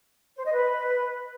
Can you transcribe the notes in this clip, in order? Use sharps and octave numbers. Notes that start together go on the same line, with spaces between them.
C5
D#5
B4